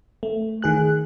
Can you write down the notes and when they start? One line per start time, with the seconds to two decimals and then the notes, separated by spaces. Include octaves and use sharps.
0.23 A3
0.62 D#3 G#4 F#6